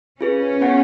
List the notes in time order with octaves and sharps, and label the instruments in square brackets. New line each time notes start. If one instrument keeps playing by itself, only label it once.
[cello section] C#4 [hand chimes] F4 G#4 B4
[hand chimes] B3 F4 G#4 C#5 F#5